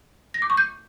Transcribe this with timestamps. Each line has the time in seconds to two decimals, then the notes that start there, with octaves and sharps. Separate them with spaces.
0.34 A#6
0.42 D6
0.50 C#6
0.57 G6